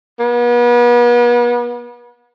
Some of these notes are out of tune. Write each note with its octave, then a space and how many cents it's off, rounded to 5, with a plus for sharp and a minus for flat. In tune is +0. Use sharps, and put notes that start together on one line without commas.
B3 -40